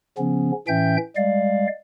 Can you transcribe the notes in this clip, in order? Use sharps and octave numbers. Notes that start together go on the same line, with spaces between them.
C#3 F3 B3 C#4
A2 E3 C#4 E5 G5 G6
G3 G#3 D5 F5